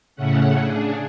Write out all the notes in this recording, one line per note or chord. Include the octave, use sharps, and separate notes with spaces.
A2 C#3 A3 C#4 F#5
C#3 D4 G#4